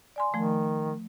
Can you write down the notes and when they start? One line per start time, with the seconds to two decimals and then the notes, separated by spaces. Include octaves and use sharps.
0.16 D5 G#5 C6
0.34 D#3 F3 A3